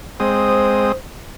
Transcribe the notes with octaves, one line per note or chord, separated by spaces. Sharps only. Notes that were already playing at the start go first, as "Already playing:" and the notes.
G#3 C4 C5 D#6